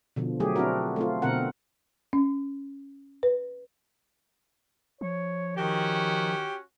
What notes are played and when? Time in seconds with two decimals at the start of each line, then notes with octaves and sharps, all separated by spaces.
0.16 B2 D3 F3
0.40 F#3 A3 G4 G#4
0.56 C4 D4 E4 F#4 A#4
0.96 A3 C4 F4
1.22 B2 D3 C4 A#4 F#5
2.13 C#4
3.23 B4
5.01 F3 C#5
5.57 D#3 C#4 F#4 G4